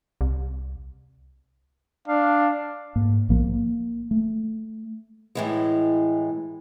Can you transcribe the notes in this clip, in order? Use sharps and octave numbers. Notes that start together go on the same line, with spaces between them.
C2
D4 F5
G#2 A#3
A#1 A2 F3 A#3
A#3
A3
A2 E3 G#3